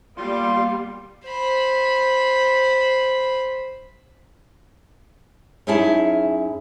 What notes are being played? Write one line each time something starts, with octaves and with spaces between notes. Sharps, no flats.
G3 A#3 B3 F4 F5 C6
C5 B5
F#2 C#4 D#4 E4 G#4 A5